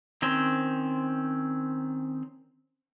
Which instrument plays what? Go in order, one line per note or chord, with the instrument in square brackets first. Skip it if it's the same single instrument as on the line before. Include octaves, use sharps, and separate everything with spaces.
[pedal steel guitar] D#3 C4 C#4 C5